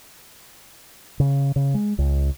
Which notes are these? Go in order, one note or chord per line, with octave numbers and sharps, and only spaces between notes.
C#3
C#3
G#3
C#2